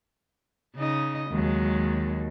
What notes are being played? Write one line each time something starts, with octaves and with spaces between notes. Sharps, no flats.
C#3 D#4 D#5
D#2 F#3 G#3